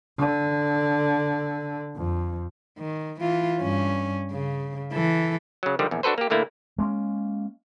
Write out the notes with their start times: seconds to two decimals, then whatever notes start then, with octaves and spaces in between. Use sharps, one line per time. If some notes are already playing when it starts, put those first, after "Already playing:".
0.18 D3
1.96 F2
2.79 D#3
3.21 E3 F4
3.61 G2 C#4
4.31 C#3
4.93 E3 A4
5.63 C#3 F#3
5.79 D3 D#3 F3 G3
5.91 A#1 E2
6.03 D4 F#4 A4 B4 C5
6.18 A#3 G4
6.30 A2 D3 A3 A#3 E4
6.78 G#3 A#3 C4 C#4